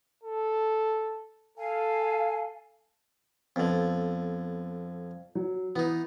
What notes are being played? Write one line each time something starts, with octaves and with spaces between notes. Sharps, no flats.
A4
A4 F5 G#5
F2 D3 B3
F#3
E3 B3 D#4